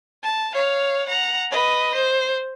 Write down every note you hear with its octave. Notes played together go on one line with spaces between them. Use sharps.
A5
C#5 F5
F#5 A#5
B4 D#5
C5